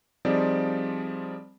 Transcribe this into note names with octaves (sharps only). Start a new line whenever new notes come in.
F3 G3 C4 D#4 G#4 D5